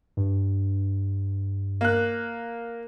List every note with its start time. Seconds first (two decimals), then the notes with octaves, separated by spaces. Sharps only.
0.17 G2
1.81 A#3 F#6